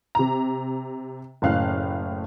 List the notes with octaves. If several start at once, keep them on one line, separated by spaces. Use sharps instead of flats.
C3 A#5
F#1 A2 F5 F#6